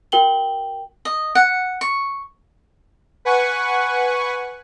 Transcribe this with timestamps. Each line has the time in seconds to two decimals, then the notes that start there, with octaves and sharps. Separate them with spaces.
0.12 F#4 A#4 G5 F#7 G7
1.05 D#5
1.35 F#5
1.81 C#6
3.25 B4 F#5 G#5 C#6 F#6